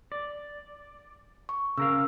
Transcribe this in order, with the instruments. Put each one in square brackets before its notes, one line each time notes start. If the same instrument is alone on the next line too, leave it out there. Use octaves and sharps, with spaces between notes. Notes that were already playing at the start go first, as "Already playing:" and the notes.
[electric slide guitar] D5
[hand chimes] C#6
[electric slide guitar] C#3 A#4 F5 [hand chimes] E6